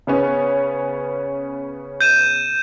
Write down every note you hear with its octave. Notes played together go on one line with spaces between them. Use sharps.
C#3 B3 C#4
G6 D#7 E7